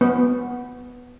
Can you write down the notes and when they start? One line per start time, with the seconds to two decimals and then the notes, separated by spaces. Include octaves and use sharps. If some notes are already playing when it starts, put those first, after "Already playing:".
0.01 B3